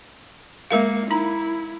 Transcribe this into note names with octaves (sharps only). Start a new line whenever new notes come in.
G#3 A#3 A#4 F5
D#4 E4 A#5